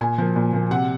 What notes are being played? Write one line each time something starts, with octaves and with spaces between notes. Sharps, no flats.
A#2 G#5
F3 A#3
A#2
F3 A#3
C3 F#5